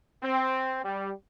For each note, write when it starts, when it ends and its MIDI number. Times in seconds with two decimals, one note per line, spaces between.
0.23 0.81 60
0.84 1.11 55